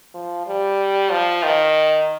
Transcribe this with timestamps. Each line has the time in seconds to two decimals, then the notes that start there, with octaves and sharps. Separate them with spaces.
0.14 F3
0.46 G3
1.11 F3
1.43 D#3